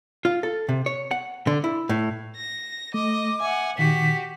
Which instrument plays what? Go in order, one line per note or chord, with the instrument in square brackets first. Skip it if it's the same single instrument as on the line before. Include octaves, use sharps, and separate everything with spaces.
[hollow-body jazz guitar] F4
A4
C3
C#5
F#5
D3
E4
A2
[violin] A#6
[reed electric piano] A3 [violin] D#5 [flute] D6
[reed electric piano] E5 [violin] F#5 G#5
[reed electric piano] A#2 D#3 [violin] F#4 G4 [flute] B6